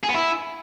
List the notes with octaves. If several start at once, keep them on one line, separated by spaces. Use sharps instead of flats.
G#4
B3
E4